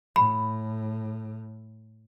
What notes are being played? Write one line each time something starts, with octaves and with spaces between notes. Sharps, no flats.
A2 B5